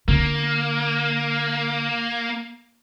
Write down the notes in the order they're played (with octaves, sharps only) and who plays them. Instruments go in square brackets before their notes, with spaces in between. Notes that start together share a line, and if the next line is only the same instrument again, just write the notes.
[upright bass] D3 [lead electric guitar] A#3